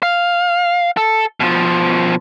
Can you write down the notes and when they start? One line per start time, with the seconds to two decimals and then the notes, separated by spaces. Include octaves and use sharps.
0.03 F5
0.97 A4
1.40 B2 F3